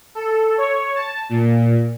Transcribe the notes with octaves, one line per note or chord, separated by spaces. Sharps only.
A4
C#5
A5
A#2